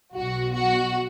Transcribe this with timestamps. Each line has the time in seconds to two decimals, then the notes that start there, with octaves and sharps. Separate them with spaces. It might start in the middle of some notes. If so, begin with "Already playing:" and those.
0.15 B1 B2 F#3 F#4
0.54 F#4